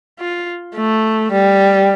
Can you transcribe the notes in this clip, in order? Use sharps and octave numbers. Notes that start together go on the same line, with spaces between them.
F4
A3
G3